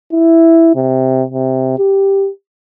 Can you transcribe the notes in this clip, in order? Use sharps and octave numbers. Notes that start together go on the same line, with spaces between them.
E4
C3
C3
G4